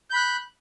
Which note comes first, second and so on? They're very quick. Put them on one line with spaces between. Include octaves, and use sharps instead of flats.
G6 B5 F#6